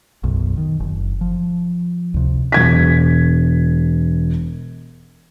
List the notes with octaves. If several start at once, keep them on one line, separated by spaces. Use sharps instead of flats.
B1 F#2
D#3
F#1
F3
C#2 C3
E1 G#6 B6